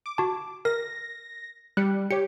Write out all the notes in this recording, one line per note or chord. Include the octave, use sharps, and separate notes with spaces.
D6
F#4 A5
A#4 A#6
G3 F#6 C#7
G4 C#5 C#7